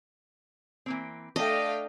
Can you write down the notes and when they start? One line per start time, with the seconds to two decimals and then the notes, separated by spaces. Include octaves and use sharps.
0.86 E3 A#3 C4
1.36 A3 D4 D#5 F5 G5